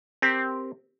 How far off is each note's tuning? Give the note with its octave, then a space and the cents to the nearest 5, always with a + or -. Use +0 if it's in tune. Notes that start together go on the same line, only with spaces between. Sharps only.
C4 +0 G4 +0 A#4 +0